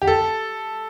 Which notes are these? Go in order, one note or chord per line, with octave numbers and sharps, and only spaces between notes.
G4
A4